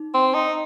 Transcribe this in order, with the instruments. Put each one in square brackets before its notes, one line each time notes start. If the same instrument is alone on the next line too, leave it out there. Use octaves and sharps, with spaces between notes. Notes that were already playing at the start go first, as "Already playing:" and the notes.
Already playing: [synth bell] D#4
[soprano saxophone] C4
D#4